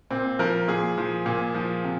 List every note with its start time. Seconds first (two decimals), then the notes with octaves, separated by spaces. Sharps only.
0.11 A#2 C4
0.39 F3 A#4
0.68 A#2 G#4
0.98 F3
1.26 A#2
1.54 F3
1.84 C3